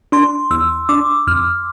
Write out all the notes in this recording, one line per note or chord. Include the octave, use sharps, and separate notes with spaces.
D4 C6
E2 E6
D4 D6
F2 F6